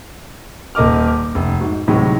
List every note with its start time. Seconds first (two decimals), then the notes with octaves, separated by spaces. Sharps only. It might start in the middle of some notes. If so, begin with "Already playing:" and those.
0.75 D#1 A#4 D#5 D6 F6
1.08 D6
1.35 F1
1.61 G#2 F#4
1.88 D2 A2 C3 D#3 F#3 G#3